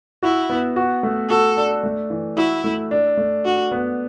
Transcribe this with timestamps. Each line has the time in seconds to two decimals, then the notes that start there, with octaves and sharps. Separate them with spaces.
0.23 E4 F#4
0.50 B3
0.76 F#4
1.03 A3
1.30 F#4 A4
1.57 D4
1.84 A3
2.10 E3
2.37 E4 F#4
2.64 A3
2.91 D4
3.17 A3
3.45 D4 F#4
3.71 B3